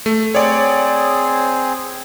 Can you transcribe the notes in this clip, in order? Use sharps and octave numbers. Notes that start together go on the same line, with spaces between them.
A3
C4 G#4 C#5 D5